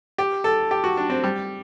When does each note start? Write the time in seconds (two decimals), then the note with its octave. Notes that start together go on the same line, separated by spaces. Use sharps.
0.18 G4
0.44 A4
0.71 G4
0.84 F#4
0.97 D4
1.10 C4
1.24 G3